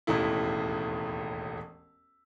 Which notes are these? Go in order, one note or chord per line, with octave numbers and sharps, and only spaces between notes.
E1 A1 D#2 A3 E4